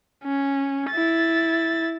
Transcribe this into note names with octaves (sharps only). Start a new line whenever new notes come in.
C#4
E4 A6